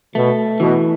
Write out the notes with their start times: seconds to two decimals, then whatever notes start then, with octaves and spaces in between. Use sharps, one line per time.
0.15 B2 A3
0.60 B2 E3